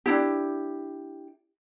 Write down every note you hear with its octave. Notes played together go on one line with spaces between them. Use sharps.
D4 E4 G4